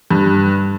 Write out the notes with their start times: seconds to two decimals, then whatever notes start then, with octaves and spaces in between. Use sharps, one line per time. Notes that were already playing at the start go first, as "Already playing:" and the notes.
0.11 G2